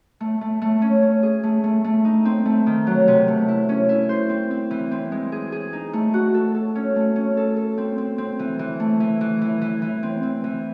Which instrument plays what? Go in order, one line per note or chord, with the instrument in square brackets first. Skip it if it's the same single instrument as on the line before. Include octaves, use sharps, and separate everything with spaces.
[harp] A3
A3
A3
C#4
C#4
G#4
A3
A3
A3
D#4
C4
A3
D#3
F#3
C3
A3
E4
C#4
E4
C5
C4
C4
E3
C4
G#3
G#4
G#4
D#4
A3
F#4
A4
A4
C#4
A3
C#4
A4
A4
C4
C4
C4
E3
E3
A3
E3
E3
E3
E3
E3
C4
C4
E3